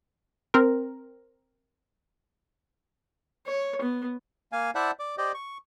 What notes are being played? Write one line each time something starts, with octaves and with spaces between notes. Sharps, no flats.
C4 A#4
C#5
B3
A#3 F5 G#5
E4 C5 D5 E5 F#5 A5
D5 D6
G4 C5 D5 D#5
C#6